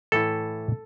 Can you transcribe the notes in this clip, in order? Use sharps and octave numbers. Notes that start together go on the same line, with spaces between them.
A2 E3 A3 E4 A4